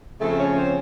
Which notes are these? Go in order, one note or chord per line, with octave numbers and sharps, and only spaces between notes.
C#3 F3 A3 C4 A4
C#4 C#5
C4 C5